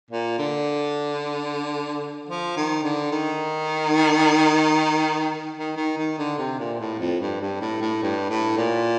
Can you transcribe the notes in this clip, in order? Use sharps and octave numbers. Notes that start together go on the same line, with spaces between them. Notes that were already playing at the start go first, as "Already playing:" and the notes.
A#2
D3
F3
D#3
D3
D#3
D#3
D#3
D#3
D3
C3
A#2
A2
F2
G2
G2
A2
A2
G2
A2
A#2